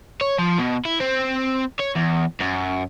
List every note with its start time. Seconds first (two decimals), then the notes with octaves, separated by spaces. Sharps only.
0.21 C#5
0.39 F3
0.59 B2
0.85 E4
1.00 C4
1.80 C#5
1.96 E2
2.41 F#2